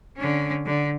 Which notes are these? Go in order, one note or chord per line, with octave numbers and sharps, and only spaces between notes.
D3 C#4
D3